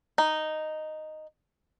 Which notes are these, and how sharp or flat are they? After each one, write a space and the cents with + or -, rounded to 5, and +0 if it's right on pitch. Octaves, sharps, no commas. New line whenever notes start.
D#4 -5